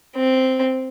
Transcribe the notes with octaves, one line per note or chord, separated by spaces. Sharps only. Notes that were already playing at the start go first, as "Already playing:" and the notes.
C4